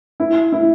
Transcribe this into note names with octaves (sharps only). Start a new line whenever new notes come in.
E4
E4